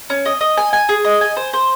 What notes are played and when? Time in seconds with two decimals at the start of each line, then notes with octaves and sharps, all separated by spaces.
0.10 C#4
0.26 D#5
0.41 D#5
0.58 G#5
0.73 G#5
0.89 G#4
1.04 D#5
1.21 G#5
1.37 C5
1.53 C5